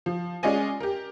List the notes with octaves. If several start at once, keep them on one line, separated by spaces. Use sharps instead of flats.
F3
G#3 C#4 F4 D5 D#5 G#5
G4 A#4